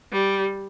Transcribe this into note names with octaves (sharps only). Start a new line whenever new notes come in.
G3